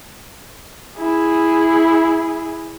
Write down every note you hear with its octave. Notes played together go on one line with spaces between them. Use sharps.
E4 G#4